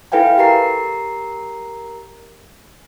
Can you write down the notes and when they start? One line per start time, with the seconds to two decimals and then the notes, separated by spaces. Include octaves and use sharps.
0.12 E4 A4 B4 F5 G5 G#5
0.38 G4 A#4 A#5 C7